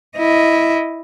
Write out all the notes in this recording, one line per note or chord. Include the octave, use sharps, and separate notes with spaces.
E4 D#5